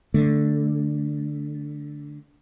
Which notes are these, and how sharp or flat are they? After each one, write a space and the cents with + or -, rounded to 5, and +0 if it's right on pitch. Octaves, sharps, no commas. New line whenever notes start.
D3 +0 A3 +0